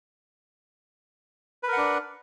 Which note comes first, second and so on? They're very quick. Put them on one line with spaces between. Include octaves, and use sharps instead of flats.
B4 A#4 F#5 D4